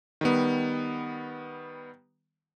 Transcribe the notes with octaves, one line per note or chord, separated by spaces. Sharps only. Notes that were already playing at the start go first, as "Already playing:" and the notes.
D#3 G3 B3